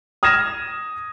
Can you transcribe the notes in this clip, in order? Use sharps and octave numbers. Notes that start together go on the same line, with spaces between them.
D#6 F6 G#6 A#6 E7